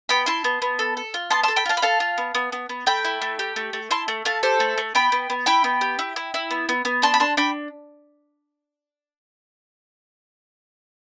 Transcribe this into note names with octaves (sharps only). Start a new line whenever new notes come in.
B3 G5 B5
E4 A5 C6
B3
B3
A4
A4
F4
B3 A5 C6
A5 C6
A4
G5 B5
F4 F5 A5
B5
A4 F5 A5
F4
B3
B3
B3
B3
A3 G5 B5
E4
A3
G4
A3
A3
E4 A5 C6
A3
A3 F5 A5
G4 A4 C5
A3
A3
B3 G5 B5
B3
B3
E4 G5 B5
B3
G4
E4
E4
E4
B3
B3
B3
D4 A5 C6
B5
D4 A5 C6
D4 G5 B5